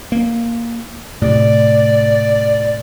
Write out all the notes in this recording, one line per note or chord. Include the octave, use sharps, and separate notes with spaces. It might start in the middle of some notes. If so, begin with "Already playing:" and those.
A#3
A2 C3 D5